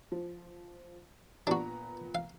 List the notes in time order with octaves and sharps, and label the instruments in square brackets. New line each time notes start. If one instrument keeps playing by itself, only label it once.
[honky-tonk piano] F3
[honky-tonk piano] A#2 B3 A#5 [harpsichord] D4 F#4
[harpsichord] F5